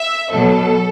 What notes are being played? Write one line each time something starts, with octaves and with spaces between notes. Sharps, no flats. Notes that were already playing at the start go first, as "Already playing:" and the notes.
Already playing: E5
B2 F#3 A4